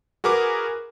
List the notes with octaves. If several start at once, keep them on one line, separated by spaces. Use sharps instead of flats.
F#4 G#4 A#4 B4 D6